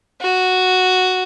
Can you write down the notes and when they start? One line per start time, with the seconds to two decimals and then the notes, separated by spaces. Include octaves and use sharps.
0.21 F#4